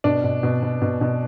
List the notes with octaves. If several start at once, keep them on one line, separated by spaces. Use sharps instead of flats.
B2 D4
B2
B2
B2
B2
B2